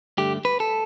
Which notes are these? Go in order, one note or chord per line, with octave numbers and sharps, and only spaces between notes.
G2 D3 A3 G4
B4
A4